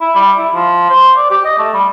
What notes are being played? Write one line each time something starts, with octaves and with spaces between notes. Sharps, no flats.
E4
G3
E4
F3
C5
D5
G4
D#5
A3
G3